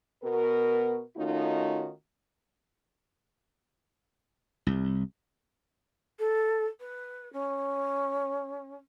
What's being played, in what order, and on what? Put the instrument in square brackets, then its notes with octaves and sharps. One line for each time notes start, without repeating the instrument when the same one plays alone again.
[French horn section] B2 B3 F#4 A#4
D#3 A3 C#4 D#4 F4 F#4
[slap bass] C2
[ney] A4
B4
C#4